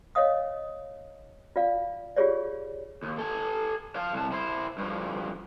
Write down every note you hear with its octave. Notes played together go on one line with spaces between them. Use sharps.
C#5 D#5 F5 D#6
F4 D5 F5
F4 G4 G#4 C#5 D5
D#2
A4 G#5
F5 A5
C2 A5
E4 C5
G2 F3